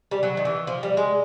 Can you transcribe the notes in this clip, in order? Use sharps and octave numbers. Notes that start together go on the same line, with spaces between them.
G3
F#3
D#3
E3
F3
G3
G#3